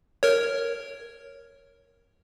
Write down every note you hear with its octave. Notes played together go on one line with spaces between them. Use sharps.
A#4 C#5